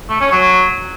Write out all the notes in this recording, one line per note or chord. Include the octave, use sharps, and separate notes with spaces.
A3
C#4
F#3